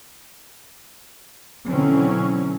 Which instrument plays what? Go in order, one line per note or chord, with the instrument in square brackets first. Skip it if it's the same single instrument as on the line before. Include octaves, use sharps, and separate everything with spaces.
[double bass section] B2 D3 E3 F#3 C4 C#4